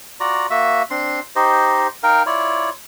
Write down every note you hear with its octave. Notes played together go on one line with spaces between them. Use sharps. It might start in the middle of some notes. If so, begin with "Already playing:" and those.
F4 F#4 D5 A#5
A#3 F#4 E5
C4 D4 C6
D#4 G4 C5 D#5
D#4 A#4 F5 G5
E4 F4 C#5 D5